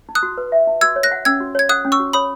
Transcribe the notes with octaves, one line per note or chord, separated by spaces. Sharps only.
D#4
D#6 F#6
F#4
B4
E5
D#4
F#4 E6 G#6
C#5
F#6 A#6
F#5
C#4 E6 G#6
F#4
C#5 G#6
F#5 D#6 F#6
C#4
C#6 E6
F#4
C#5 B5 D#6